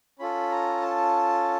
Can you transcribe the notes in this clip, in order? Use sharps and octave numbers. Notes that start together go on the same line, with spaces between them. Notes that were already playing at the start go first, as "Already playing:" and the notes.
C#4 F4 A4 B5
A#5
A5